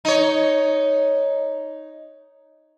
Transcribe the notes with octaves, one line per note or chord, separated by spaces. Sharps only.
D#4 C#5